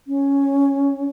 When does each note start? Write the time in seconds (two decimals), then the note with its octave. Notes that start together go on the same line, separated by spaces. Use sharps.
0.07 C#4